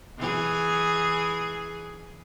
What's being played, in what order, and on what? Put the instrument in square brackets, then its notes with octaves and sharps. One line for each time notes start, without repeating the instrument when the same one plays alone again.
[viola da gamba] E3 G#4